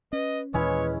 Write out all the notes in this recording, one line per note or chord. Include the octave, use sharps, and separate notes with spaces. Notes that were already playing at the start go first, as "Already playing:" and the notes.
C#4 B4 D#5
D#2 A#2 E3 G#3 C#4 E4 B4 C#5